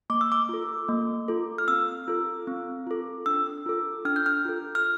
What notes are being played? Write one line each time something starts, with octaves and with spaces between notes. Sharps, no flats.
A#3 D6
E6
D6
F4 A4
A#3
F4 A4
F6
C4 E6
F4 A4
C4
F4 A4
D4 E6
F4 A4
D4 F6
G6
F6
F4 A4
F6